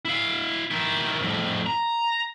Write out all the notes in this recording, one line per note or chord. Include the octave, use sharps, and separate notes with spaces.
E4 F5
D#3 E4
F2 A2
A#5